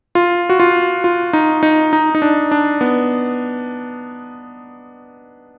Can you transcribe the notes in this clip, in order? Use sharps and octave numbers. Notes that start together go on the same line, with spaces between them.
F4
F#4
F4
F4
D#4
D#4
D#4
D#4
D4
D4
B3